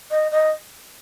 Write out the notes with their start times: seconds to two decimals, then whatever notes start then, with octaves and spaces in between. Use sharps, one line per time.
0.11 D#5
0.32 D#5